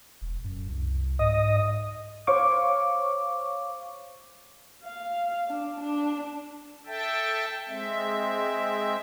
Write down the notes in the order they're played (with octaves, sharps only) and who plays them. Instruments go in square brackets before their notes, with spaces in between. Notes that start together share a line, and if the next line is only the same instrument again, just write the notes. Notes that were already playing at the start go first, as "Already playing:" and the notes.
[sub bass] E1
F#2
C2
[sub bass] G#2 [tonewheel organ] D#5
[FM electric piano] C5 C#5 F5 C#6 D6
[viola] F5
D4
D4
[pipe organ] A4 E5 G5 A5
G#3 C4 E5